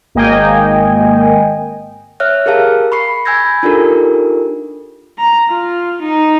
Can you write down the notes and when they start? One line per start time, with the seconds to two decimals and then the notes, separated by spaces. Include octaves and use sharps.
0.15 G#1 A#3 D#5 G5 G#5
2.20 C#5 E5 F6 F#6
2.46 G4 G#4 A#4 F5 A5
2.92 B5 C#6 C7
3.25 G#5 B5 E6 G6 G#6 A#6
3.63 D4 D#4 F4 G4 A4 A#4
5.18 A#5
5.49 F4
6.02 D#4